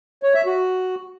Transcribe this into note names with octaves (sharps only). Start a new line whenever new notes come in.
C#5
E5
F#4